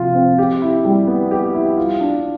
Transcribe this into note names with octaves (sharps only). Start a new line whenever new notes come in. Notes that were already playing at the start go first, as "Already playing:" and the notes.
Already playing: C3 F3 F4
C4
G4
E4
G3
B3
G4
E4
F4
D4